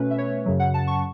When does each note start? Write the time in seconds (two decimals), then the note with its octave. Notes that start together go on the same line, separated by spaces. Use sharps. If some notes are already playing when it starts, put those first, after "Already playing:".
Already playing: B2 A3 C#4 B4
0.10 E5
0.18 C#5
0.46 F#2 C#3 F#3
0.60 F#5
0.74 A5
0.87 C#6